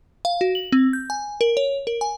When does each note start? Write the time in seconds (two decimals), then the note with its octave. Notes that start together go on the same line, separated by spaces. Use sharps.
0.25 F5
0.41 F#4
0.55 F#7
0.72 C4
0.93 G6
1.10 G#5
1.41 A#4
1.57 C#5
1.87 A#4
2.01 G#5